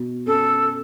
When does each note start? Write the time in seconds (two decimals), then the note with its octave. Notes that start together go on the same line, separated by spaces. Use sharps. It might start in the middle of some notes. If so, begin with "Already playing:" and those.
Already playing: B2
0.26 C#4 A4